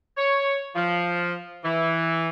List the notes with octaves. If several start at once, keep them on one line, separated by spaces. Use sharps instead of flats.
C#5
F3
E3